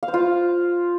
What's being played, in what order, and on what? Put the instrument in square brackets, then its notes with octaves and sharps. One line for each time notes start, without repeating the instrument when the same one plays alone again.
[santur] F5
C5
F4